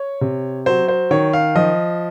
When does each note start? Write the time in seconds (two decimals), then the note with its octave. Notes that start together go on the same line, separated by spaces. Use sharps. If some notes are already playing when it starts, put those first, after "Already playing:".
Already playing: C#5
0.21 C3
0.66 F#3 C5
0.88 C5
1.11 D#3 C#5
1.33 F5
1.55 F3 D#5